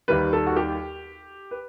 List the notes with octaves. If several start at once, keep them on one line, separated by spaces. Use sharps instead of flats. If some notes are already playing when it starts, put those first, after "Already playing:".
D#2 D#3 G3 B4
A4
F#4
G4
B4